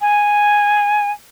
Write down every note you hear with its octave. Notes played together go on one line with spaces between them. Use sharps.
G#5